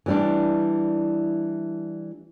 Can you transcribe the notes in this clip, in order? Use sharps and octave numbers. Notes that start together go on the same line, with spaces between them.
E3 G3 D4